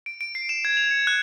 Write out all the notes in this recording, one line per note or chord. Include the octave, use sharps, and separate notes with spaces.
D7
D7
C7
E7
G#6
F7
C#7
F#6